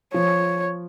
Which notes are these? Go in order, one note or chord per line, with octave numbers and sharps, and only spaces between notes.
F3 C#5